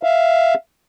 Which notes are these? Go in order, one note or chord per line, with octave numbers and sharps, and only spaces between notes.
E5 F5